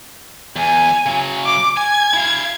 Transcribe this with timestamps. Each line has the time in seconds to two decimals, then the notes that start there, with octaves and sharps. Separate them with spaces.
0.56 E2 G#5
1.06 C#3 F#3
1.46 D6
1.77 G#5 G#6
2.14 E4 F5